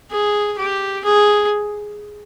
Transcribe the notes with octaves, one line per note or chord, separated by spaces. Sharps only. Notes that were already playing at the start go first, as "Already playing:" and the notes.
G#4
G4
G#4